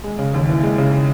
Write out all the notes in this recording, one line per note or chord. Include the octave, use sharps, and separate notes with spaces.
G#3
C#3
D#2
E3
G#3
C#3